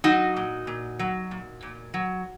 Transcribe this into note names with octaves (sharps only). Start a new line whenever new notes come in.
F#3 D#4 F#4
A#2
A#2
F#3
A#2
A#2
F#3